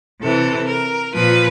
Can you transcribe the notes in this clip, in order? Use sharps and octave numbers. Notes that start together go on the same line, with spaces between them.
C3 E3 A4
A#4
A#2 F3 B4